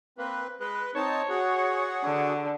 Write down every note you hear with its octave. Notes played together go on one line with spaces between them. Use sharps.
A#3 C4 B4
G#3 B4
C4 D#4 C#5 A5
F#4 G#4 F#5
D3